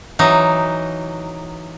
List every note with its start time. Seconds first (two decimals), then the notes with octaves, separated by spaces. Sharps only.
0.19 E3 F#3 D#4